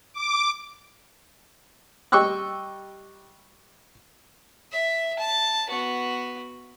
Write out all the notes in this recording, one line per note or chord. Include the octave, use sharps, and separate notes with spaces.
D6
G3 D#5 G5 C#6 E6 F#6
E5
A5
B3 F#4